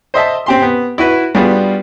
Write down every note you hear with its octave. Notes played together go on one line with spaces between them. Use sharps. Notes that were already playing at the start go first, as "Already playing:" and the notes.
C5 D#5 E5 A5
C4 G4 C6
B3
E4 F#4 B4
G3 B3 D4 F4 F#4 G#4